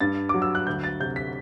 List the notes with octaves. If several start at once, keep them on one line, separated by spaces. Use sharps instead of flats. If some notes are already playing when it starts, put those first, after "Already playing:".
G2 A6
F#3 D6
E6
F#6
D2 G6
A6
C3 G6
B6